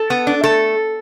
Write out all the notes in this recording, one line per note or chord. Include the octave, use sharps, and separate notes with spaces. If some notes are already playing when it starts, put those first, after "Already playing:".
Already playing: A4
B3
D4
A3 A4